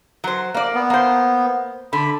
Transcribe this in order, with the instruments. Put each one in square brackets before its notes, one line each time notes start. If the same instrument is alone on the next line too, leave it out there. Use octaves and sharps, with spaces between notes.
[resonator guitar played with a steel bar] F#3 C5
A#3 D5
[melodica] B3
[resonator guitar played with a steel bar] A#3 C5
[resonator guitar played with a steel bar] D3 [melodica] B5